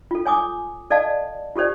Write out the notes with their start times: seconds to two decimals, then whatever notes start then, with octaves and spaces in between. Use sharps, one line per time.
0.11 F4 A4
0.26 C#5 G#5 D6 D#6
0.90 A4 D5 D#5 F5 A5
1.56 F4 G4 A4 C5 D5